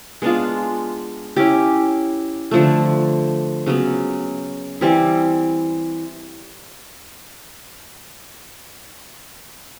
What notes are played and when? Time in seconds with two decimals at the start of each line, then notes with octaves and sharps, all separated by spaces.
0.22 G#3 B3 D4 F4
1.36 C#4 E4 G4
2.51 D3 F3 A3
3.66 C#3 F#3 B3
4.81 E3 G3 C4 E4